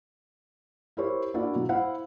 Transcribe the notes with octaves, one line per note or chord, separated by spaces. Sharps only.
E4 G4 A#4 C5 C#5
A#3 D4 E4 F#4 D5
B2 F#3
E4 C5 F5 F#5